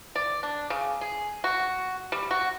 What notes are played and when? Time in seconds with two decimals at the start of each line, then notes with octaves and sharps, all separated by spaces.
0.15 D5
0.43 D4
0.70 C#3
1.01 G#4
1.44 F#4
2.12 G3
2.31 F#4